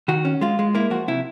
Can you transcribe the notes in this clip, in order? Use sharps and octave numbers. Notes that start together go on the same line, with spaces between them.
D#3 F#4
C#4
G#3 F4
G#3
A#3 E4
F3 F#4
C3 E4